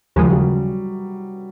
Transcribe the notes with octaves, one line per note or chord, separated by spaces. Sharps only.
D#2 C#3 F3 G3 G#3
F#3
G3